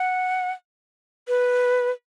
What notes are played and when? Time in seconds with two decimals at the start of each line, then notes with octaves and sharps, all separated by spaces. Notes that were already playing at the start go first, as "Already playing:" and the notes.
Already playing: F#5
1.28 B4